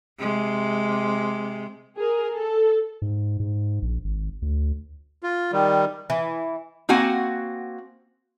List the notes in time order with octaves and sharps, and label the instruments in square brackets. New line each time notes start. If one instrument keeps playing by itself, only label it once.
[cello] C3 G#3
[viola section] G#4 A#4
A4
[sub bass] G#2
G#2
A#1
G#1
D2
[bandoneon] F4
D#3 G3
[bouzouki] E3
[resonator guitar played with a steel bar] A#3 C4 F#4 F#5 G#5